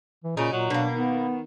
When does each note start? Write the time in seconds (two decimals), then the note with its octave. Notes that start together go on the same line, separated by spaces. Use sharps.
0.24 E3
0.37 A#2 C#3 D#4
0.52 A#2 F#3
0.70 B2 A#3 D4
0.95 D#3 B3